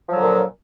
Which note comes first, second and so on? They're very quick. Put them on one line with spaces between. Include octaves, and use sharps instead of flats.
F3 F#3 D3 A#2